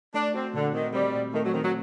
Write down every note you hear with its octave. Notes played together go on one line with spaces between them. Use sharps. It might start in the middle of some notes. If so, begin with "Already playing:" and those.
A3 D4
C4 F#4
A#2 D3
D#3 C4
G3 C4
A#2
D#3 A3
F#3
D#3 C4
F#3